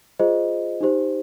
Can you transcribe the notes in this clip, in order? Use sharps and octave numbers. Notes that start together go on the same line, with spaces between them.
F4 G#4 C5 D#5
D#4 G4 C5